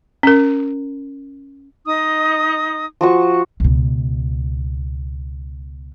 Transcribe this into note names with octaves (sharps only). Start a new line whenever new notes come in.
C#4 A#4
D#4 D#5 D#6
F3 F#4 C#6
C#2 B2